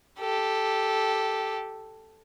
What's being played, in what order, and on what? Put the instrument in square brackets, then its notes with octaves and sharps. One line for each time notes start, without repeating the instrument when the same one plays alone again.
[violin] G4 A4